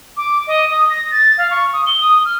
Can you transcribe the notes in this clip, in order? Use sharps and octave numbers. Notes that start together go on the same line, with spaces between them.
D6
D#5
D#6
A#6
A6
F5
C#6
D#6
G7
D#6
F6